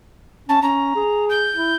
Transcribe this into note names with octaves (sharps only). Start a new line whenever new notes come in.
C#4 A5
C#4 A#5
G#4
G6
E4